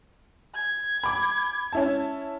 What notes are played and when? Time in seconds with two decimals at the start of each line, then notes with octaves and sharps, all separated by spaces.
0.54 G#6
1.03 B5 D6
1.73 C#4 E4 A5